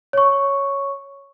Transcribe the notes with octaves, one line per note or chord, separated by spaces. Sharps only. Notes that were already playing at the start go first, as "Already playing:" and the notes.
C#5 C#6